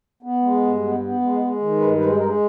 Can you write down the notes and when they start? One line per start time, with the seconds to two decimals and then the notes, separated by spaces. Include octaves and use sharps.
0.23 B3
0.42 G#3
0.62 G2
0.81 B3
1.00 B3
1.21 G#3
1.41 G#3
1.60 D#3
1.79 G2 B4
1.99 G#3 B4
2.18 G#3 A#4